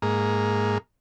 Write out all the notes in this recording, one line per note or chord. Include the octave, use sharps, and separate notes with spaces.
G#2 A#3